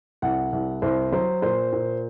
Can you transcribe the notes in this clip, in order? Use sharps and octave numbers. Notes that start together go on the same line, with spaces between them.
C2 F#5
C2
C2 C5
F#3 C5
A#2 C5
A#2